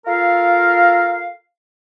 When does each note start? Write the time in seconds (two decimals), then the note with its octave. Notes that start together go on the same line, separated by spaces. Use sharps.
0.06 F4 A4 A#4 F5